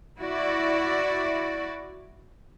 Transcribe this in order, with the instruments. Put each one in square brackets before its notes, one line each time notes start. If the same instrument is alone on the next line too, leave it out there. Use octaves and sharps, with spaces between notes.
[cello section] E4 F#4 D5